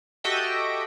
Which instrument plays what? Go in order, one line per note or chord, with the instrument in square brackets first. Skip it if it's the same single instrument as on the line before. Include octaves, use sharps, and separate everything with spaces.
[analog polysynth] F#4 G4 A4 D#5 E5 G5